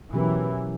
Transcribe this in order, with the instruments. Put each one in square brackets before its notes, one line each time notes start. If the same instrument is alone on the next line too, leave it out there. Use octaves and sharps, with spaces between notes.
[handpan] B2 F#3 C#4 G4 A#4 [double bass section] E3